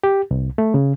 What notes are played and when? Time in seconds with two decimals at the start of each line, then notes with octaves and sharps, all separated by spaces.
0.04 G4
0.31 C2
0.58 A3
0.74 C#3